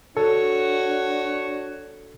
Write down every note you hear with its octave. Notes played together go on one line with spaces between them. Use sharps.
D4 F#4 A4 C#5